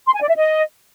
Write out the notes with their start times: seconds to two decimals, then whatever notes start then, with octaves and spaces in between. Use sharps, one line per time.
0.07 C6
0.14 G#5
0.21 D5
0.29 E5
0.36 D#5